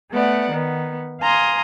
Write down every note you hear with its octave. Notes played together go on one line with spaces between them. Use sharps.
A3 B3 D5 F#5
D#3 B3
F5 G#5 A#5 C6 D#6